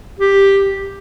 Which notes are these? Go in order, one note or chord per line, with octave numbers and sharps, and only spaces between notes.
G4